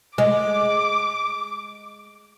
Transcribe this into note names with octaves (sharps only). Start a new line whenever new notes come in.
G#3 D6